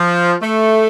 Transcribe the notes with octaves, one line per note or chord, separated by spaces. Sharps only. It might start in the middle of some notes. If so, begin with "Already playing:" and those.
Already playing: F3
A3